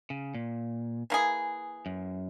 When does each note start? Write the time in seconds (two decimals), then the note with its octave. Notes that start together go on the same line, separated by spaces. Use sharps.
0.10 C#3
0.35 A#2
1.10 E3 A#3 E4 G#4
1.86 F#2